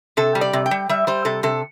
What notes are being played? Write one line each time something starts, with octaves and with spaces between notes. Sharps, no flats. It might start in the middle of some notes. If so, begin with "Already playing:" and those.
C3 A4
G3
D5
C3
G5
G3
G3 E5
G3 C5
C3 A4
C3 A4